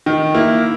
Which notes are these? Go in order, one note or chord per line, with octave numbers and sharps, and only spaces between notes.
D#3
A#3 E4